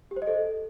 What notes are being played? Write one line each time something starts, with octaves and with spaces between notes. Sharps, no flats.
G4
C5
D#5
A4